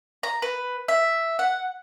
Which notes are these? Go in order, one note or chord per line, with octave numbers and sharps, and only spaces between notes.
A#5
B4
E5
F#5